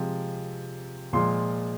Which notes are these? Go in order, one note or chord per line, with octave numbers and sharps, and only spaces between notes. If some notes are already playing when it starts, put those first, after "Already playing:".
Already playing: C3 F3 G#3
A#2 F3 G#3 C6